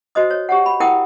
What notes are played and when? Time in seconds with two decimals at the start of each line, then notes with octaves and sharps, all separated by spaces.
0.15 F#4 C5 D#5 D#6
0.31 C#5
0.49 G4 C#5 F#5
0.66 B5
0.80 E4 A#4 F#5 G5 D#6